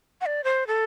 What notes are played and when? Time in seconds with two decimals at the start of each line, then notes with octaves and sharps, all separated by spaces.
0.21 F#5
0.26 D5
0.44 C5
0.67 A4